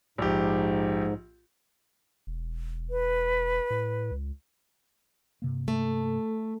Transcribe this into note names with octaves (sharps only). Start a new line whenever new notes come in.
A#1 G#2 G4
E1
B4
A2
C#2
G2 C3 A#3
A3